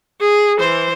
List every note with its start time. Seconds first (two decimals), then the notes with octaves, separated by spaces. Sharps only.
0.21 G#4
0.59 E3 C5